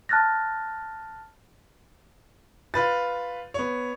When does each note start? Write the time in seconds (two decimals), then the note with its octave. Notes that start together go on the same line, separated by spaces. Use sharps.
0.09 A5 F6 F#6 A6 A#6
2.74 F4 B4 A6
3.54 B3 C#5